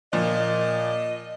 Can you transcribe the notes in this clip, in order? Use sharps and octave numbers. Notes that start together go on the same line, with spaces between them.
A#2 F3 D#5